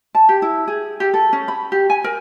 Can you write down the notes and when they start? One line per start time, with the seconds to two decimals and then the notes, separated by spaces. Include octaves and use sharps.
0.15 A5
0.29 G4
0.42 E4
0.68 G#4
1.00 G4
1.14 A4
1.33 C#4
1.48 B5
1.72 G4
1.90 G#5
2.04 A#4